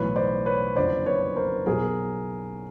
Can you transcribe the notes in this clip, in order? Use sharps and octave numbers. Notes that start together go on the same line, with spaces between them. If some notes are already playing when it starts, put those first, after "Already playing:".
Already playing: B1 A2 E3 B4 C#5
C5 D5
B4 C#5
F#1 F2 D3 C5 D5
B4 C#5
A#4 C5
B1 B2 G#4 A#4